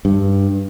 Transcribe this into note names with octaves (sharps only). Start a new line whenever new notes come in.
G2